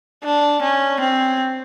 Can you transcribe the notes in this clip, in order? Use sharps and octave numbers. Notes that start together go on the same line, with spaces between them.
D4
C#4
C4